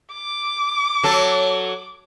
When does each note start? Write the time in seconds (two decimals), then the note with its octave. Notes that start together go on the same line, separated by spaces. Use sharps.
0.13 D6
1.03 F#3 A4